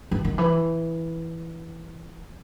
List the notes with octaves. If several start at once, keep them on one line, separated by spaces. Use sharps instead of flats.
E3
D#3
E3